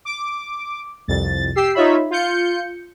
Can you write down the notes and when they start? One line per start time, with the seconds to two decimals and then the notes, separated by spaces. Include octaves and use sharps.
0.05 D6
1.08 C2 F2 A6
1.55 G4 E6 C7
1.74 D#4 F4 C#5 E5 B5
2.11 F4 G6 C#7